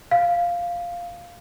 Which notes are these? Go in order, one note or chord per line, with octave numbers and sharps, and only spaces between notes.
F5